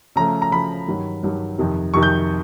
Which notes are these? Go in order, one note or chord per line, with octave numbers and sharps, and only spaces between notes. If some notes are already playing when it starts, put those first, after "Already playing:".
C#3 F3 A3 A#5
A#5
C#3 F3 A3 B5
G2 D#3 F#3
G2 D#3 F#3
F2 C3 D#3
F2 C3 D#3 C#6
G6